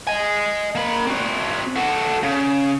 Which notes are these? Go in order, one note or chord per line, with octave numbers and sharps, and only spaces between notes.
D#5 G#5
A#3 B5
C4 F#4
F#4 A4
C#3